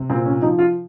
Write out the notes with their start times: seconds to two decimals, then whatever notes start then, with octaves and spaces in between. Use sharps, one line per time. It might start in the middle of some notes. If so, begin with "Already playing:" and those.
Already playing: C3
0.10 A#2 C4
0.25 C#4
0.42 F3 D#4
0.59 F4